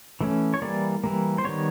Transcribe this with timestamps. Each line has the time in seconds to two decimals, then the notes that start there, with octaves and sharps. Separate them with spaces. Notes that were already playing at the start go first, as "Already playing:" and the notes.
0.21 E3 A3 C#4
0.54 C#5
0.62 E3 G3 A#3 D5
1.04 E3 G3 A#3
1.38 C5
1.44 D#3 G3 B3 C#5